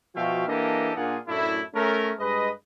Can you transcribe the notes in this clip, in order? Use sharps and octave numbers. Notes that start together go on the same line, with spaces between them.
B2 F3 F#4 E5 F5 G5
E3 A#3 D4 G4 A4 D#5
A#2 A#3 D4 F4 G#4 F#5
F#2 A2 A3 D4 E4
A3 C#4 A#4
G2 G#3 B4 D#5